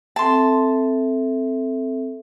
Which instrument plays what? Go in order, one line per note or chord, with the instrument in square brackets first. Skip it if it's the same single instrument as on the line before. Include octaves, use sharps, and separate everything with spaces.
[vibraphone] C4 A4 E5 [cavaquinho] A5 C6